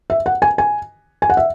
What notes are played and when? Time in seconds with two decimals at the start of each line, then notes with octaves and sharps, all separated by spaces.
0.10 E5
0.26 F#5
0.42 G#5
0.58 G#5
1.22 G#5
1.30 F#5
1.37 E5